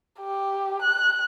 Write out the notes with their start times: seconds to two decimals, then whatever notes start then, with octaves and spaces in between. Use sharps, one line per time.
0.20 G4
0.82 F#6